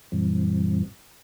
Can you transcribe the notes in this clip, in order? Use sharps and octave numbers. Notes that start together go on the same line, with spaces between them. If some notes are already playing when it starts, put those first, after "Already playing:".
F#2 A#2 E3 G3 C4